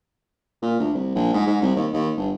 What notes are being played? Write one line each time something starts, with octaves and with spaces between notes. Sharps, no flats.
A#2
D2
C2
A#1
G#2
G#2
C2
D#2
D#2
G1